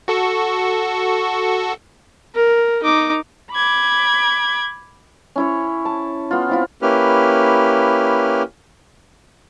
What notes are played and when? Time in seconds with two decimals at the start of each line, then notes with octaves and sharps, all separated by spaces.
0.08 F#4 A4 C#6
2.35 A#4
2.83 D#4 D6
3.52 B5 D6 G#6
5.36 C#4 E4 C#5
5.85 A5
6.31 B3 F4
6.49 C4 E4 F4
6.82 A#3 C#4 E4 G4 B4 F6